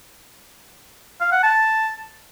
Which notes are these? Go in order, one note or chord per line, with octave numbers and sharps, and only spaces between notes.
F5
F#5
A5